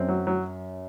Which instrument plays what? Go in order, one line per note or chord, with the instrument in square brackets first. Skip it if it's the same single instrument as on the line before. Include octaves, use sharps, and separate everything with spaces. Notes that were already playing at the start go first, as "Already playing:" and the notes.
Already playing: [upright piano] F#2 [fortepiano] C4
[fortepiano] F#3
F#3